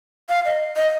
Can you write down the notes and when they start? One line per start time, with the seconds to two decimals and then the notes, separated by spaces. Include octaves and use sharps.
0.29 F5
0.45 D#5
0.76 D#5